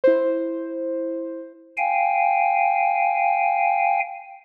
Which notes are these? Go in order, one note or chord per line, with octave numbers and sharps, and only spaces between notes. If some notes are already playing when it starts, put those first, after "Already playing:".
E4 C5
F5 G5 G#5